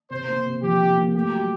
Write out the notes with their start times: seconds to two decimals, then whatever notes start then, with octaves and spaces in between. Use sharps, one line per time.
0.10 C3 C5
0.28 A#3
0.46 C3
0.62 F3 G4
0.80 C3
0.97 A#3
1.14 A3 G4
1.33 F#3